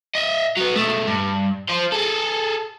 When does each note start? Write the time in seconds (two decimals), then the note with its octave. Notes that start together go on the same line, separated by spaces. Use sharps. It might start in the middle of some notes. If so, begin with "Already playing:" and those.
0.15 D#5 E5
0.57 F#3 B3
0.76 B2 A3
1.07 G2
1.69 F4 C5
1.92 G#4 A4